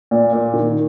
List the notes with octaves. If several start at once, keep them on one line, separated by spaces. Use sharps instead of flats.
A#2
A#2
D#3